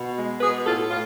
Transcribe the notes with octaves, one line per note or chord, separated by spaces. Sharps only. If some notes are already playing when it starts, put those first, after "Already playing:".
Already playing: B2
G#3
B2 G#4 B4
A2 F4 A4
A2 F4